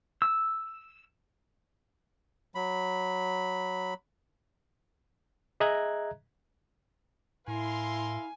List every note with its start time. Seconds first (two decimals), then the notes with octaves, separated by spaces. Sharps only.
0.22 E6
2.55 F#3 B5
5.60 G#4 D#5 E5 A#5 F#6 G#6
7.48 A2 E4 A#4 F5 G#5 C6